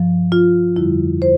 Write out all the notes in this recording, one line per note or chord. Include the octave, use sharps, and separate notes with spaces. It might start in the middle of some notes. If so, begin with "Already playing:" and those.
Already playing: G2 F3
F4
F2 D3 G3 E4
C5